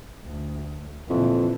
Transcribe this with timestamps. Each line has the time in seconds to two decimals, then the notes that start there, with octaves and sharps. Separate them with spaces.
0.24 D2
1.10 F2 A#2 D3 E3